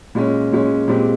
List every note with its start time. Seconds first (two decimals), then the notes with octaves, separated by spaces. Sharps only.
0.15 A#2 G#3 C#4
0.52 A#2 G#3 C#4
0.88 A#2 G#3 C4 G4